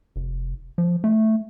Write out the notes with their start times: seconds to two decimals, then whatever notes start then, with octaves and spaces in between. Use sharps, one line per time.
0.16 F1
0.78 F3
1.04 A3